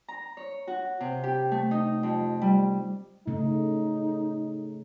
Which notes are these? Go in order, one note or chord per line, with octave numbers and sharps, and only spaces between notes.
A#5
C#5
F#4
C3
G4
A3
D#4
F2
G3
C#3 A3 D#4